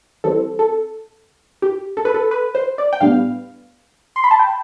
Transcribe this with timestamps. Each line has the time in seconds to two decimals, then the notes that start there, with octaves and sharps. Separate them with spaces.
0.24 E3 G3 C4 A4
0.59 A4
1.62 G4
1.97 A4
2.05 B4
2.14 A4
2.31 B4
2.55 C5
2.78 D5
2.93 G5
3.01 A2 G3 B3 D4 F5
4.16 C6
4.24 B5
4.31 A5
4.39 G5